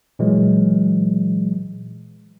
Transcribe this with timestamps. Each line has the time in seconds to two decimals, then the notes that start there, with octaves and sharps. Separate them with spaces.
0.19 A#2 E3 F#3 G#3